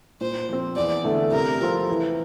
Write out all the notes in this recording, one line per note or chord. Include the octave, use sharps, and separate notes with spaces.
A#2 C5
F3 C4
E2 D5
D3 A3 E4 A4
C3 A#4
F3 C4 F4 A4
E3